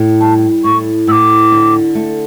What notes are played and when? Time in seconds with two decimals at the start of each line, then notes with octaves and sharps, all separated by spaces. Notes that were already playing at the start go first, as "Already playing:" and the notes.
Already playing: A2
0.20 G3 A5
0.64 A2 C#6
1.07 A2 E6
1.11 D6
1.52 D3
1.95 A3